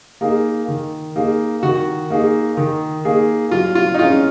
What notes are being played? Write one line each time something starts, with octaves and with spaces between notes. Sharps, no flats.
A#3 D#4 G#4
D#3
A#3 D#4 G#4
D#3 F#4
A#3 D#4 G#4
D#3
A#3 D#4 G#4
F#3 F4
F4
D#4
C#4 F4 G#4